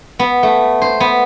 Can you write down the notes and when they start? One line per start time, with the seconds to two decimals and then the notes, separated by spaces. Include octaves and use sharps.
0.19 B3
0.43 A3
0.82 C5
1.00 B3